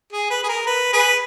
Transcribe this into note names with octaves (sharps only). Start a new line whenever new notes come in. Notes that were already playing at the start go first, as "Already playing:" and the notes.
G#4
B4
G#4
A#4
B4
G#4 B4